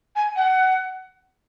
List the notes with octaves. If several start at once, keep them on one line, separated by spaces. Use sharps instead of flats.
G#5
F#5